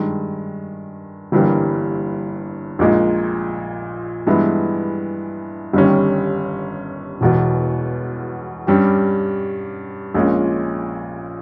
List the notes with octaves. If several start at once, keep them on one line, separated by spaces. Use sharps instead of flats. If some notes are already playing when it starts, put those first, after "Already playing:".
Already playing: G2 D#3 G#3
G1 G2 E3 G3 A#3
A#1 A#2 G#3 D#4
G2 E3 G#3 B3 E4
G1 G2 D#3 G3 C#4
E1 E2 B2
G2 G3 C#4 G4
A#1 A#2 G#3 C#4